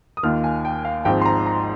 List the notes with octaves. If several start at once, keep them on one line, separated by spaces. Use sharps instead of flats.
D#6
D#2 D#3 A#3 F4 F6
G#5
G5
F5
G#1 G#2 F3 C4 G5
C6
A#5
A#5